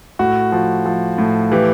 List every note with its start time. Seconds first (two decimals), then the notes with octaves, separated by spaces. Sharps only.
0.19 A2 F#4
0.52 F3
0.86 F3
1.18 A2
1.52 E3 G4